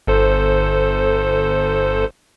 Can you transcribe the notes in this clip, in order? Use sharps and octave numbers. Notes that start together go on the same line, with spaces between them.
G1 A4 C5